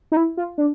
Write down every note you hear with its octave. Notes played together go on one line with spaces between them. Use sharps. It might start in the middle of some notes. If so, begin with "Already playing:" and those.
D#4
E4
F4
D4